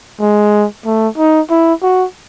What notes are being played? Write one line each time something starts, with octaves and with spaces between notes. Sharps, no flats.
G#3
A3
D#4
E4
F#4